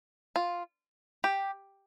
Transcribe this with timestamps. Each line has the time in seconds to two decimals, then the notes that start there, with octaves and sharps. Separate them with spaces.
0.36 F4
1.24 G4